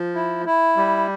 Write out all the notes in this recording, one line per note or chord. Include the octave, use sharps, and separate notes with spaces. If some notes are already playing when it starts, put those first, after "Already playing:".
Already playing: F3
E4
E4
G3